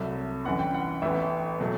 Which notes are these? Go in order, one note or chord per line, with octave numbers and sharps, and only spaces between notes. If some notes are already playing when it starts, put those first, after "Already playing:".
Already playing: C2 C3 F#3 A3 E5
G1 F#2 E3 F#5
G5
F#5
A1 A2 E3 B3 E5
B2 F#3 A3